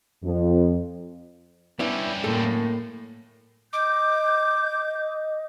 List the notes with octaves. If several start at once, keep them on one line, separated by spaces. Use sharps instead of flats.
F2
G3 B3 C#4 D4 E4
D2 A2 A#3 A4
D#5 D6 G6